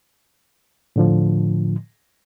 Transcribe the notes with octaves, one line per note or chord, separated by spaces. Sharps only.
A2 D3 F3